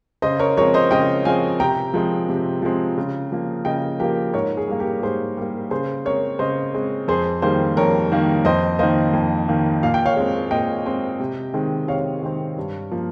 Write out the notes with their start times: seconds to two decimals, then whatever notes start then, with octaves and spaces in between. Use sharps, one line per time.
0.22 C#3 C5 D#5
0.39 A#4 C#5
0.57 F3 G#3 C4 A#4 C#5
0.74 C5 D#5
0.91 C#3 D#5 G5
1.25 F3 G#3 C4 F5 G#5
1.60 C3 G5 A#5
1.94 F3 G#3 C4
2.29 C3
2.62 F3 G#3 C4
2.98 C#3
3.32 F3 A#3
3.65 C#3 D#5 G5
3.99 F3 A#3 G4 A#4
4.33 G#2 A#4 C#5
4.57 G#4
4.68 G3 A#3
4.80 G4 A#4
5.03 G#2 G#4 C5
5.37 G3 A#3
5.71 C#3 G#4 C5
6.05 G#3 C4 A#4 C#5
6.39 C#3 C5 D#5
6.75 G#3 C4
7.08 F2 G#4 C5
7.42 D#3 G3 A#3 G#4 C5
7.77 F2 A#4 C#5
8.12 D#3 G3 A#3
8.45 F2 C5 D#5
8.79 D#3 A#3 C5 D#5
9.13 F2
9.48 D#3 A#3
9.83 A#2 F5
9.94 G5
10.06 C#5 F5
10.16 G#3 C4
10.51 A#2 D#5 G5
10.86 G#3 C4
11.20 C3
11.54 D#3 G#3 C4
11.88 C3 C#5 F5
12.23 D#3 G#3 C4
12.57 G2
12.91 F3 A#3